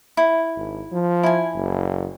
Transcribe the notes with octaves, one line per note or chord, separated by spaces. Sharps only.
E4
G#1
F3
E4 G#5
F#1